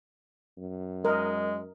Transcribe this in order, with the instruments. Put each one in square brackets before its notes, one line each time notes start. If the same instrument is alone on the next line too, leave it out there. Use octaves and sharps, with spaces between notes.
[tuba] F#2
[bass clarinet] G#3 [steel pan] A#4 D#5